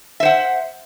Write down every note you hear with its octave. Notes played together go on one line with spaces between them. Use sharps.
C5 E5 F#5